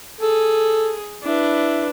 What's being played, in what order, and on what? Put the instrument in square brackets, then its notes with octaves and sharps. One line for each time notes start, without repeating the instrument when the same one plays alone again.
[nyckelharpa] G#4 [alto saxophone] A4
[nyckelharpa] D4 B4 [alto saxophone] E4